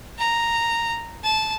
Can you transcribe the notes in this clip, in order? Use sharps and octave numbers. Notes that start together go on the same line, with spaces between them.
A#5
A5